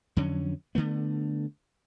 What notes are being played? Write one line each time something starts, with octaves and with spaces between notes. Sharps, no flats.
F2 D3 F#3 C#4
D3 E3 A3 B3